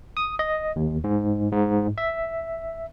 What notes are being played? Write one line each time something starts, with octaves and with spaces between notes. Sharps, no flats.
D#6
D#5
D#2
G#2
G#2
E5